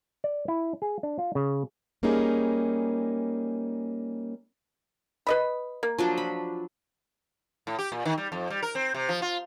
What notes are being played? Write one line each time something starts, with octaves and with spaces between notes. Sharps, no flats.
D5
E4
G#4
D4
F4
C#3
G3 A#3 C#4 D#4 G#4
B4 D#5 B5
A#3
F3 F#3 D4
B5
A2
G4
A#2
D#3
G3
F2
G3
A#4
C4
C3
F3
F4